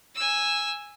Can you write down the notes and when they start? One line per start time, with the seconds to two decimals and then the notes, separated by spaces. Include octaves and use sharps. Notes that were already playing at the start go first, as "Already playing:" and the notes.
0.15 G#5 E6